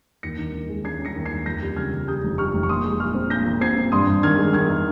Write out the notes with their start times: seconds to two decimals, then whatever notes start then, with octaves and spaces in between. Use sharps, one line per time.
0.23 D#2 A#6 C#7
0.38 D#3
0.54 D#3
0.69 G#3
0.84 C#4 G#6 C7
1.00 C#4
1.05 A#6 C#7
1.16 D#2
1.26 G#6 C7
1.31 D#2
1.46 F2 G6 A#6
1.61 G3
1.76 C#3 F6 G#6
1.92 C#3
2.07 G3 D#6 G6
2.23 F1
2.38 G3 C#6 F6
2.53 F1
2.63 C#6
2.69 A#2 C6 D#6
2.84 G#3
3.00 G#3 C#6 F6
3.15 C4
3.30 A#2 G6 A#6
3.46 A#2
3.61 C4 G#6 C7
3.76 C4
3.92 G2 C6 D#6
4.07 G2
4.23 D#3 F6 G#6
4.38 G#3
4.53 D#3 F6 G#6
4.69 D#3